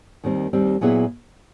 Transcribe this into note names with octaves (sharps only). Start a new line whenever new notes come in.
D#2 D#3 G3 C4
D#2 D#3 G3 C4
A#2 F#3 B3 E4 G#4